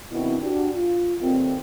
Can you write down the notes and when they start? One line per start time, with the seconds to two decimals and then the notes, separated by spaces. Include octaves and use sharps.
0.12 B2 D#3 C4 D4 E4
0.41 D4 F#4 G4
0.75 F4
1.21 D#2 A#2 D#3 A3 C4